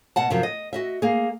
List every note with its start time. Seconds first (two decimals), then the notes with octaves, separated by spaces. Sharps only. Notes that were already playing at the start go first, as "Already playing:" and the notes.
0.16 B2 F#5 A5
0.30 F#2 C3 F3 F#4 E5
0.43 D#5
0.73 F#4 D#5 E5
1.02 A#3 G#4